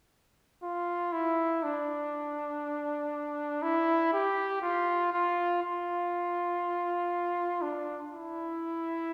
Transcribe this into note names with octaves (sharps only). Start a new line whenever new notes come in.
F4
E4
D4
E4
G4
F4
F4
F4
D4
E4